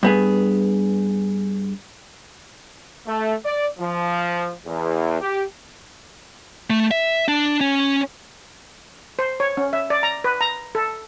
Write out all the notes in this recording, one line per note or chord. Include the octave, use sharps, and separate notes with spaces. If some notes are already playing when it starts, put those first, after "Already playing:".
G2 B3 G#4
A3
D5
F3
E2
G4
A3
E5
D4
C#4
C5
C#5
C#4
E5
D5
A#5
B4
A#5
A4